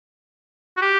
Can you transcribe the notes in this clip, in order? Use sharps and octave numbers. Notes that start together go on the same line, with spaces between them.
F#4
G4